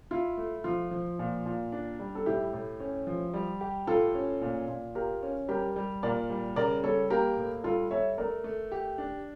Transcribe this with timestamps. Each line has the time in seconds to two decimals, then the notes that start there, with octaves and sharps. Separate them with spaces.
0.11 E4 F4
0.37 A3
0.64 F3 F4
0.91 F3
1.19 A#2
1.46 A#2
1.72 D4
1.99 G3
2.15 A4
2.26 A2 E4 G4
2.53 A2
2.80 C#4
3.07 F3
3.34 G3
3.61 G4
3.87 A2 F4 A4
4.15 C#4
4.41 A#2
4.68 A#2
4.95 F4 G4 A#4
5.23 C#4
5.48 G3 G4 A#4
5.76 G3
6.03 A#2 A#4 D5
6.30 G3
6.56 C#3 A#4 D5
6.83 G3 A4 C#5
7.10 A#3 G4 A#4
7.37 A2
7.64 G3 F4 A4
7.91 A4 C#5 E5
8.18 A3 A#4 D5
8.44 A3
8.72 G4
8.98 D4